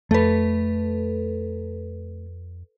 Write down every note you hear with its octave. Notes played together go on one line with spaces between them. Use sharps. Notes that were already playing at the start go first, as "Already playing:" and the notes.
F2 A3 A4 B4